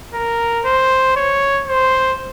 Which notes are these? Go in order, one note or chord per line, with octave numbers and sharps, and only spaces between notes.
A#4
C5
C#5
C5